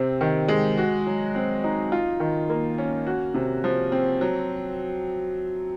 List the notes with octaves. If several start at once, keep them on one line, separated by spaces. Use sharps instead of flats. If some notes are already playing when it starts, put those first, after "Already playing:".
Already playing: C3 C4
D#3
G#3
F#4
F#3
C4
D#4
F4
D#3
A#3
C#4
F#4
C3
F3
C4
F#3